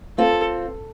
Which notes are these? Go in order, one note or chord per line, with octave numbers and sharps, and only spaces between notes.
C4 F4 A4